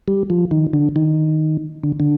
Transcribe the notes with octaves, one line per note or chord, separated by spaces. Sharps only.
G3
F3
D#3
D3
D#3
D3
D3